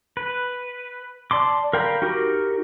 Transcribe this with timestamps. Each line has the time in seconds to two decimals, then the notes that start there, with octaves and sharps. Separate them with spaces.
0.17 B4
1.31 D5 A5 C6 D6
1.73 A#4 F5 G5 A#5 B5
2.02 D#4 F#4 G4 A#4